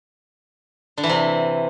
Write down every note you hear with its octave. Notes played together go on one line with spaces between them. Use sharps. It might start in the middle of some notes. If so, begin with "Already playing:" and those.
D3
E3
C3